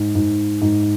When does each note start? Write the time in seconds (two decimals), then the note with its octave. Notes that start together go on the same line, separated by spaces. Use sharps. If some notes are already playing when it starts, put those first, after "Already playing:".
Already playing: G#2
0.15 G#2
0.62 G#2